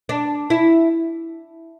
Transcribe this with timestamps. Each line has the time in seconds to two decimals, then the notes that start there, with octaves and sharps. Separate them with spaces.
0.09 D4
0.50 E4